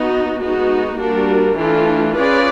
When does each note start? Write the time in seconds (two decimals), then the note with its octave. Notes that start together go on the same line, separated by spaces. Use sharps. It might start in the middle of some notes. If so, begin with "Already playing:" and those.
Already playing: B3 D#4 F#4
0.39 G#3 B3 D#4 F#4
0.98 G3 A#3 D4 F#4 A#4
1.57 E3 A3 D4 F4 A4
2.16 C#4 F4 G#4 B4 D5